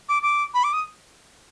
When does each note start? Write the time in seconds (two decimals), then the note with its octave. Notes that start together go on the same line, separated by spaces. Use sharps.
0.09 D6
0.23 D6
0.54 B5
0.64 D6
0.73 D#6